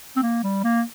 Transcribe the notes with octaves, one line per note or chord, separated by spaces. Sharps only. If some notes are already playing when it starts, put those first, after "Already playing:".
C4
A#3
G3
A#3